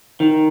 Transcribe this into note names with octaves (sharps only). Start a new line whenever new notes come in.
D#3